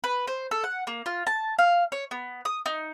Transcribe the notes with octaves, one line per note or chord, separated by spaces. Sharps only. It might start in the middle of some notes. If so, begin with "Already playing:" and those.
B4
C5
A4
F#5
A#3
F4
A5
F5
C#5
B3
D#6
D#4